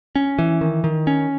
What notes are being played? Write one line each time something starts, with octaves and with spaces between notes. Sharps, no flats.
C#4
E3
D#3
D#3
C#4